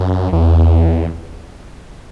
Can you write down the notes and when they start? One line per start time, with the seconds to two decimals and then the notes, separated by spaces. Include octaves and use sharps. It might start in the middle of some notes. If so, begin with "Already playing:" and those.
Already playing: F#2
0.33 E2